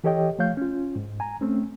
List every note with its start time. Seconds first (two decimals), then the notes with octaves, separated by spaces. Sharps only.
0.04 E3 G4 A4 C#5 D#5 G5
0.39 F3 A3 C#5 F5 G6
0.57 C#4 F4
0.96 G#2
1.20 G#5 A#5
1.41 A3 C4 C#4